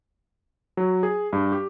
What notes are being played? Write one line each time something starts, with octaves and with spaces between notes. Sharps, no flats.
F#3
G#4
G2
G4